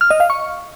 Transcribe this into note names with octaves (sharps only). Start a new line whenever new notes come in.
F6
D#5
F5
C#6